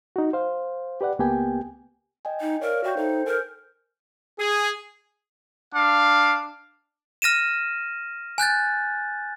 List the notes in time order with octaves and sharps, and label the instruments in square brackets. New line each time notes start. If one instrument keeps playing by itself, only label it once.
[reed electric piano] D#4 F#4
C5 F5
G4 B4 D5 F#5
C#2 A#3 B3 G4 G5 G#5
[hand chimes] D#5 G5 G#5
[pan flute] D#4
[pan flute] A#4 [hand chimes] C#5 D5 F5
[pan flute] F#4 [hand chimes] E5 G5 G6
[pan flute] D#4 [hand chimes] A4 C5
[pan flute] A#4 [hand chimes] G#5 F6 G6
[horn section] G#4
[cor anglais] D4 [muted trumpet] F5
[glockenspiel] F6 A#6 D#7 E7
G#5 F#6 G6 A6